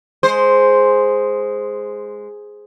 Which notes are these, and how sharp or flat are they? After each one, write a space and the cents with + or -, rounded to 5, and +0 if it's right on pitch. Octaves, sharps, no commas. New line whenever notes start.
G#3 +0 C5 +0